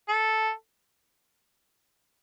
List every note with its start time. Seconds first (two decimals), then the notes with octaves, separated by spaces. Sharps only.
0.09 A4